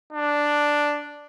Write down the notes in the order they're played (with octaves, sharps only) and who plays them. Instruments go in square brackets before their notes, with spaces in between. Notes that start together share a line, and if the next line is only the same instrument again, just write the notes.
[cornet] D4